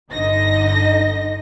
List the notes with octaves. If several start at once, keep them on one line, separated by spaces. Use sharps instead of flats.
G1 D3 D#4 D#5 A#6